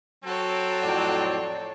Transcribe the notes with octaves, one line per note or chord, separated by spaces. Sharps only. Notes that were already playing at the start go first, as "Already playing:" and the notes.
F#3 C4 A4 C#5
F2 A2 D5